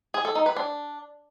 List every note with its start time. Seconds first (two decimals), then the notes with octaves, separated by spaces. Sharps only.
0.14 G#4
0.25 A4
0.35 D#4
0.46 B4
0.56 D4